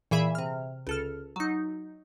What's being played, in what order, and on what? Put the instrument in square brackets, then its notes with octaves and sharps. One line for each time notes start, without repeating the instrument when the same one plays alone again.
[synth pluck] A#2 E3 G#4 E5 B5
C3 F6
C#2 A4 F6
F#3 D#4